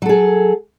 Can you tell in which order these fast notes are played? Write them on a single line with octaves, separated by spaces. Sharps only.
F#3 A4 G#4